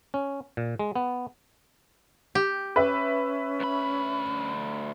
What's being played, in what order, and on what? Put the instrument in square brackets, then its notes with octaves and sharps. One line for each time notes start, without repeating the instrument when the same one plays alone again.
[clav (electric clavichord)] C#4
A#2
G#3
B3
[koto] G4
[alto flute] C#4 [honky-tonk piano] B4 E5
[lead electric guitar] D2 B5